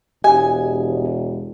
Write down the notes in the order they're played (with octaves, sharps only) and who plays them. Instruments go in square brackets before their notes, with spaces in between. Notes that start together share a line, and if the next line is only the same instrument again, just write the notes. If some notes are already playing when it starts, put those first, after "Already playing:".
[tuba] E1 [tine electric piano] G4 D#5 [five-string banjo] G#5